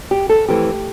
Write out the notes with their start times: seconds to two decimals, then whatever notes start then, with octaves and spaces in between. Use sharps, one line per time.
0.11 G4
0.29 A4
0.48 F2 E3 A3 G4